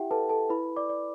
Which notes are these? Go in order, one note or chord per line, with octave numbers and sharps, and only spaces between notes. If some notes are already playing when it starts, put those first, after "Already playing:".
Already playing: E4 G4 E5 F#5 G5
A4 B4 A5
A4 A5
E4 B4 B5
D5 D6
D5